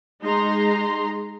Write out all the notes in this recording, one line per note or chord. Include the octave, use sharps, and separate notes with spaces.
G#3 D#4 A#5 C6